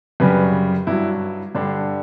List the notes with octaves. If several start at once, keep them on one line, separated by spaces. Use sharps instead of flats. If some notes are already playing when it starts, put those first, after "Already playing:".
F#2 C#3 G3 B4
G2 F#3 E4
G2 D3 G3 D4